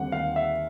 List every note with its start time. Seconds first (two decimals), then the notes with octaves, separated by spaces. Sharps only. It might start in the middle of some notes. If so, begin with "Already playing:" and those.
Already playing: D#2 D3 G3 C4 F#5
0.12 D#2 F5
0.36 E5